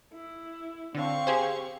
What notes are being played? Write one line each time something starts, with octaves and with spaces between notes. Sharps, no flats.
E4
D3 C4 F5 C#6
G4 G#4 C5